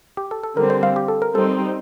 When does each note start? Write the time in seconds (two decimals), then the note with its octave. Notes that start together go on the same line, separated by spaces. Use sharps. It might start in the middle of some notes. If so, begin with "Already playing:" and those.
0.17 G4
0.31 A4
0.43 A4
0.56 D3 G3 C4 A#4
0.70 C5
0.83 F5
0.96 G4
1.08 A4
1.22 A#4
1.35 G3 C4 D#4 A4